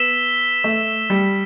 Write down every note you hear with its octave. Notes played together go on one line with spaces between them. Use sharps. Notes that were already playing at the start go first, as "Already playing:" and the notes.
Already playing: B3 E6 B6 E7 G7
A3
G3